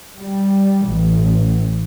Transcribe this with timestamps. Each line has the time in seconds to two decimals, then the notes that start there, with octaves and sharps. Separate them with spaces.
0.17 G3
0.87 A1